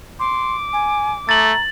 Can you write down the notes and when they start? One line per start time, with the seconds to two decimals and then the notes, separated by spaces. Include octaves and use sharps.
0.20 C6 D6
0.73 G#5
1.29 A3 A#5 A6 F#7